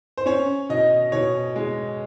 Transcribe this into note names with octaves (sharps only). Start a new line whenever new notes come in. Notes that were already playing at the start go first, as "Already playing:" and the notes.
C5
C#4 C#5
B2 D#5
B2 C#5
G#3